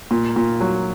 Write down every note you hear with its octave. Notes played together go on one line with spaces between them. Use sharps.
A#2
A#2
F#3